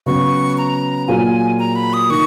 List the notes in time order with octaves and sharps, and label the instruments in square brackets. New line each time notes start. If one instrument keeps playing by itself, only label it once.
[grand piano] C#3 F#3 B3 [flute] C#6
[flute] A#5
[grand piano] A#2 F#3 A#3 F4 G#4 [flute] G#5
[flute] A#5
B5
D#6
[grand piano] D#3 [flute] C#6